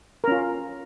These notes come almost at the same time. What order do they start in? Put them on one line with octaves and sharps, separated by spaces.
A#4 C#4 F4